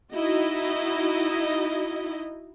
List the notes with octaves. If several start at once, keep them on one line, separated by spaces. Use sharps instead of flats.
D#4 E4 F#4 D#5